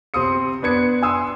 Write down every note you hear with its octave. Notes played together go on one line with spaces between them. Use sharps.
C3 C4 C6 D#6 C#7
B3 D4 B4 G#6 C#7
G#5 C6 D#6 E6